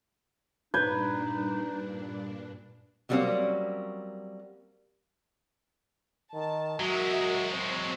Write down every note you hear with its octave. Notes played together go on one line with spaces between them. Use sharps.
G2 A#2 D4 D#4 B4 G6 G#6
C#3 F#3 G3 A#3 C4 C#4
D#3 A5
F#3 G#3 F#4 A#4 E5
C4